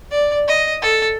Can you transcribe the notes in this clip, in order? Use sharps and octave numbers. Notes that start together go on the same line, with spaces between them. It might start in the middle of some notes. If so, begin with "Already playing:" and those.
D5
D#5
A4